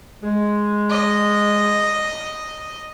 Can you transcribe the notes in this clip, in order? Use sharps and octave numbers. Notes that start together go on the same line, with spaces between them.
G#3
D#5